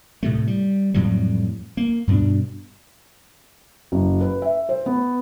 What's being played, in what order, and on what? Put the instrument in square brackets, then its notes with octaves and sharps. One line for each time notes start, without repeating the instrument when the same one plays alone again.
[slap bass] A2 C3 A3
G3
F2 A2 F#3 G3
A#3
G2 B2 B3 D4
[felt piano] F#1
B4
E5
C5
B3